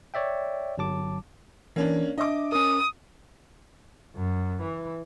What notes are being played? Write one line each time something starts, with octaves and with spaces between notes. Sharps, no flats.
C#5 D5 E5 G5
G1 F#3 A5 D6
E3 A#3 C#4 D4
D4 D#5 E5 D6
C#4 A#4 D#6
F#2
E3